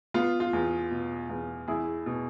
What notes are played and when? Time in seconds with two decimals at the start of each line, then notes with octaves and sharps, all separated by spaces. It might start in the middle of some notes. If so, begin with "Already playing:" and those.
0.14 B3 F4
0.40 F4
0.53 E2
0.91 B2
1.29 E2
1.68 E2 E4 G#4
2.06 B2